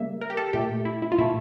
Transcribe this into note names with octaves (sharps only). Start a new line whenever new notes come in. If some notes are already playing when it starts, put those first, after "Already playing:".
Already playing: C#3 G3 A#3 E5
A#4
G4
A4
A#2 A3 G4
E4
E4
F4
A#2 A3 E4